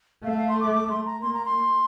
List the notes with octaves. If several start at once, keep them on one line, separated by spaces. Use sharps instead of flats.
A3 F5
E5
F5
C6
D6
D6
C6
A#5
A#3 C6
A#5
C6